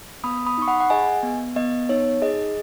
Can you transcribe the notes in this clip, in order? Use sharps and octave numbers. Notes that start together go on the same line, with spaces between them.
B3 B5 D#6
B5 D#6
D#4 C#6
F#5 B5
F#5
G#4 D#5 G#5
B3
B3 D#5
D#4 C#5
G#4 D#5